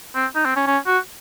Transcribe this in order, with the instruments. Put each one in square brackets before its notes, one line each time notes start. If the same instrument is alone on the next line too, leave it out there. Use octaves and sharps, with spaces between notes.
[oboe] C4
D#4
C4
C#4
C#4
F#4